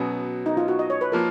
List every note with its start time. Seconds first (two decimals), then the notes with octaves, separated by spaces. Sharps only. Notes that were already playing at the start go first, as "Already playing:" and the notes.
Already playing: B2 F#3 B3 C#4
0.46 D#4
0.57 F4
0.68 F#4
0.79 D#5
0.90 C#5
1.01 B4
1.12 F3 A#3 A#4